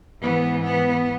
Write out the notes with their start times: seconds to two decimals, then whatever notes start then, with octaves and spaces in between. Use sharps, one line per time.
0.21 G#2 E3 B3
0.64 B3